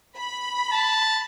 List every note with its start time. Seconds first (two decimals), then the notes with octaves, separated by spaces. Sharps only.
0.17 B5
0.73 A5